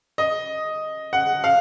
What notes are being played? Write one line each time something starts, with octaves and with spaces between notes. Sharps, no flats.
D#5
F#5
F5